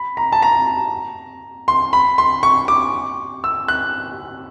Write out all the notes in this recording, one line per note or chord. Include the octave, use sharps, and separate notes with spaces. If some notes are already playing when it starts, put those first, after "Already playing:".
Already playing: B5
A#5
A5
A#5
C6
B5
C6
C#6
D6
E6
F#6